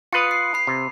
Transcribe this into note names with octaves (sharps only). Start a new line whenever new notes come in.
F4 B4 D#6 F#6 C#7
C7
B5 C7
C3